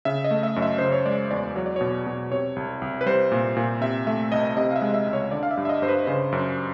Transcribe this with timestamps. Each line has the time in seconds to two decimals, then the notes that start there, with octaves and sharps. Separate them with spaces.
0.05 C#3 E5
0.24 D#5
0.31 A3
0.43 E5
0.56 F#2
0.62 E5
0.78 C#3 C5
0.92 C#5
1.06 G#3 D5
1.31 E2 D5
1.56 F#3 C#5
1.66 D5
1.76 B2 C#5
2.06 B2
2.31 C3 C#5
2.56 C2
2.82 C2
3.01 B4
3.06 G3 C5
3.32 A#2
3.57 A#2
3.81 C3 E5
4.07 A3 E5
4.32 C2 D#5
4.57 C3 D#5
4.71 F5
4.76 E5
4.82 G#3
4.94 E5
5.07 C#2
5.13 C#5
5.31 D3 D5
5.43 F5
5.51 E5
5.57 G2
5.65 E5
5.69 D#5
5.82 G2 C5
5.89 B4
6.07 C#3 C5
6.32 F#2